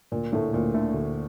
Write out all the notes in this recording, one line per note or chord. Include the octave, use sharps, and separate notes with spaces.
D2 A#2
A2 D3 A3
D2 A#2
D3 A3
D2